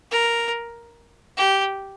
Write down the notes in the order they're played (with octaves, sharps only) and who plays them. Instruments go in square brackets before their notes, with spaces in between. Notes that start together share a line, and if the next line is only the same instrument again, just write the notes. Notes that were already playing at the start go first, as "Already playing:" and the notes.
[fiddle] A#4
G4